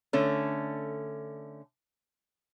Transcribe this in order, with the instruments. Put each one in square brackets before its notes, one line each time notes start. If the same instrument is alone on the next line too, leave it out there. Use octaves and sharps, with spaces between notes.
[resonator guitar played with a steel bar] D3 A3 C#4